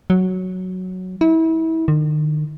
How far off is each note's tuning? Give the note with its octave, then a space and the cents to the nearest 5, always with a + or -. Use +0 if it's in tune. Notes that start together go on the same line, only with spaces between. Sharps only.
F#3 +0
E4 -30
D#3 -40